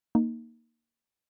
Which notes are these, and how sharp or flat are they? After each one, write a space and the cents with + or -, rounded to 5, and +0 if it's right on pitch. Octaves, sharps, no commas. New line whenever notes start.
A#3 +0 D#4 +0